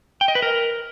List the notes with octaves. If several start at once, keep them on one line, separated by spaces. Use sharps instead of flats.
G5
D#5
B4
A#4